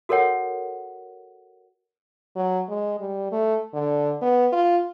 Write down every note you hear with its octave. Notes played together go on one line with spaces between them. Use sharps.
F#4 A4 A#4 C#5 F#5
F#3
G#3
G3
A3
D3
B3
F4